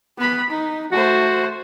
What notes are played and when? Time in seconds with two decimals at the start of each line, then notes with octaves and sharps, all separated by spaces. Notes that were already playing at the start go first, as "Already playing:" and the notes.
0.18 B3 B5
0.50 D#4
0.92 A3 F#4 C5